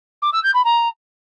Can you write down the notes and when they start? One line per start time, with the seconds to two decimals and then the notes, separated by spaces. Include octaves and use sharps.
0.22 D6
0.33 E6
0.43 G6
0.54 B5
0.65 A#5